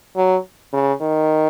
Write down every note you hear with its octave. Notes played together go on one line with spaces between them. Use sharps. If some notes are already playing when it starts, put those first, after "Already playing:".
F#3
C#3
D#3